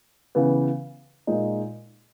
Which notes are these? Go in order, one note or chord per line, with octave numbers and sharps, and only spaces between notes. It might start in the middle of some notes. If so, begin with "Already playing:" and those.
C#3 E3 B3
A#2 G#3 D#4